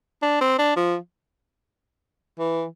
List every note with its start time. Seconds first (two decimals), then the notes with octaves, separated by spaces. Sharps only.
0.22 D4
0.41 C4
0.59 D4
0.77 F3
2.39 E3